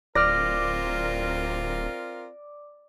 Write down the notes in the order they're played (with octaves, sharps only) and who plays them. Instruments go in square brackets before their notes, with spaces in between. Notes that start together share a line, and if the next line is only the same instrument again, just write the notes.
[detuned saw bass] D1 [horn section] C4 F4 A#4 [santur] D5 [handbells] F6 F#6 A#6